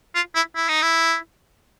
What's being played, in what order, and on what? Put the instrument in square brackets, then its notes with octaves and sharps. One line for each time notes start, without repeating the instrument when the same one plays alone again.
[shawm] F4
E4
E4
D#4
E4